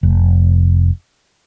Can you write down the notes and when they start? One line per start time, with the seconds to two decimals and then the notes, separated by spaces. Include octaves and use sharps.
0.03 F1